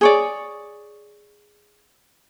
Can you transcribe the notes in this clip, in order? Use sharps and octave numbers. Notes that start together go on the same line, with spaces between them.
G#4 C#5 D5